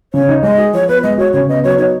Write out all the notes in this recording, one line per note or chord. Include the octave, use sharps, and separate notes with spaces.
C#3 C#5
D#4
G#3 D#5
G#4
F3 C#5
B3 B4
G#3 D#5
F#4 C#5
C#3 C#5
B3 D#5
F#3 C#5
D#4 C#5